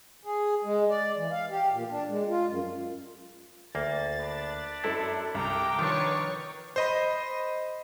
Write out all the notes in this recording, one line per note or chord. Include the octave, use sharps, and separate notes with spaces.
G#4
G#3
D5
E3
F5
G4
A#2
D4
G#3
F4
F#2
D2 A#3 A6
D4 B5
F#2 E4 A4
C2 G5 A#5 D6
D#3 F3 D4 B4 C#5 C#6
C5 D#5 B5